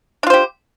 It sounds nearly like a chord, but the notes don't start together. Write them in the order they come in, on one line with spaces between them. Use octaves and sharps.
D4 F4 C5 G4